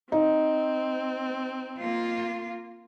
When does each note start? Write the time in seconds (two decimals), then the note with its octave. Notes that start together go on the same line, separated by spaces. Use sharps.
0.12 C4 D#4
1.78 A#3 F4